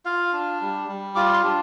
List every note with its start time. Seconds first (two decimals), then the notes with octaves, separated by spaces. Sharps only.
0.05 F4 F5
0.33 D4
0.61 G3
0.88 G3
1.16 F4 D6
1.34 C6
1.44 D4